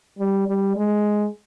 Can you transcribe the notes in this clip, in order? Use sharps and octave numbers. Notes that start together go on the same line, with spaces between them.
G3
G3
G#3